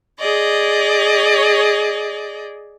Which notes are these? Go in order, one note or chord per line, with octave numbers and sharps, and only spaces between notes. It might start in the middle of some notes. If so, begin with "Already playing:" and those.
G#4 D5 D#5